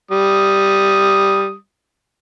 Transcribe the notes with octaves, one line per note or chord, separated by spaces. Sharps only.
G3 D#6